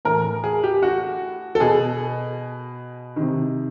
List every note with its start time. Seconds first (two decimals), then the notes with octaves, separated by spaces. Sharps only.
0.05 A2 E3 A#4
0.44 G#4
0.64 G4
0.82 F#4
1.55 A4
1.60 B2 G#4
3.16 C3 D#3